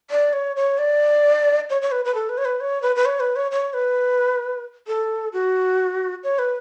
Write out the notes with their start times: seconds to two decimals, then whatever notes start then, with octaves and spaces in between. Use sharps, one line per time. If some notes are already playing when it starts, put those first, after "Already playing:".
0.11 D5
0.33 C#5
0.56 C#5
0.78 D5
1.70 C#5
1.82 C#5
1.92 B4
2.05 B4
2.14 A4
2.29 B4
2.38 C#5
2.45 B4
2.60 C#5
2.82 B4
2.96 B4
3.06 C#5
3.20 B4
3.36 C#5
3.52 C#5
3.74 B4
4.87 A4
5.33 F#4
6.24 C#5
6.39 B4